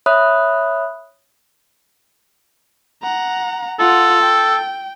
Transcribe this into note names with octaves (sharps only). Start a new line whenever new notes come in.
C#5 E5 B5 D#6 F#6
F#5 A#5
F4 A4 F#5
G5